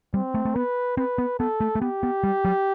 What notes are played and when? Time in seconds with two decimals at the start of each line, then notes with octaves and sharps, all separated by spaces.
0.14 G3 C4
0.35 A3
0.45 A3
0.55 B3 B4
0.97 C4 B4
1.18 B3
1.39 B3 A4
1.61 A3
1.75 A3
1.81 B3 G4
2.03 B3
2.24 G3
2.45 F#3